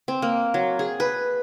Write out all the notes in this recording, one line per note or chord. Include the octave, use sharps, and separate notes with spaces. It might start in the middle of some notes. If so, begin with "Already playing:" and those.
C4
A#3
F#3
G#4
B4